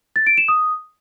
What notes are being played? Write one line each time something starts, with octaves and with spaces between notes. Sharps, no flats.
A6
D7
E7
D#6